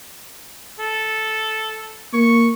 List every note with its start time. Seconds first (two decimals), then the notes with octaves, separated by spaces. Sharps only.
0.79 A4
2.13 A#3 C#6